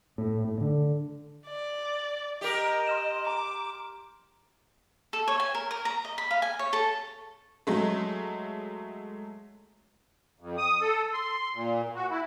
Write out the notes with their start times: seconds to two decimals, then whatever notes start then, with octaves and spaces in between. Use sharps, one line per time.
0.18 A2
0.45 A2
0.61 D3
1.47 D5
2.41 G4 A#4 D#5
2.87 C6 F6 E7
3.27 A#5 D6
5.13 A4
5.28 C#5
5.40 G#5
5.55 A#4
5.71 A#4
5.85 A#5
6.05 D#5
6.18 B5
6.31 F5
6.42 G#5
6.59 C#5
6.73 A4
7.67 F#3 G#3 A3
10.40 F2
10.58 D#6
10.81 A4
11.13 C6
11.54 A#2
11.95 F#4
12.11 E4